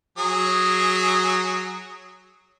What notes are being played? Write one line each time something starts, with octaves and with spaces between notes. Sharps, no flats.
F#3 G#4